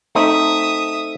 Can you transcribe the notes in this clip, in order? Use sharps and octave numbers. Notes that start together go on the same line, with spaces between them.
A3 C4 D#4 E5 D#6